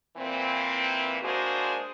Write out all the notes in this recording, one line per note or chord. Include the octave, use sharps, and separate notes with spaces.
A#2 E3 C4
G#3 A#3 D4 F#4 G#4 C5